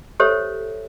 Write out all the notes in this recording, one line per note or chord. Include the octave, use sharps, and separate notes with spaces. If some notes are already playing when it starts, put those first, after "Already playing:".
G4 A4 C5 C#5 E5